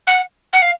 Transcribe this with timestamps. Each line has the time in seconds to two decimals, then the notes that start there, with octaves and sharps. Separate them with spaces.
0.07 F#5
0.53 F#5
0.62 F5